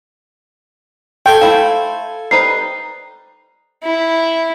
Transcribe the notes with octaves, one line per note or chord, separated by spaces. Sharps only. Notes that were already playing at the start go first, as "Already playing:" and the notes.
A4 G5 G#5
A3 E4 C5 F5
G3 D#4 B4 C5 C7
E4